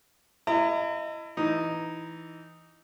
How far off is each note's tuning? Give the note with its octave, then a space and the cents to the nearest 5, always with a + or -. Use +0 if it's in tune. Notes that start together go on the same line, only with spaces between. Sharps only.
E4 +25 D#5 +0 A#5 -35
E3 +0 D#4 +0